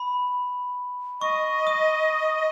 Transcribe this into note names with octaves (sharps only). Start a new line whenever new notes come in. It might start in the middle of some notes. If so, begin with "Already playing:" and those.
Already playing: B5
D#5 C#6
D#6